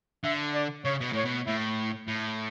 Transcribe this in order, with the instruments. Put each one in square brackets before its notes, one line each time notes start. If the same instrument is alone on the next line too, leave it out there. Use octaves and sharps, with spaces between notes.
[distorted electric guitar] D3 [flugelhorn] E5
[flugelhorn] D5
[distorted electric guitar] C#3 [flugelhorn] C#5
[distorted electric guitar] B2
[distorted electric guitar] A2 [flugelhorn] C#5
[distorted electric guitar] B2
[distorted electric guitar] A2 [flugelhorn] E4
[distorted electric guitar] A2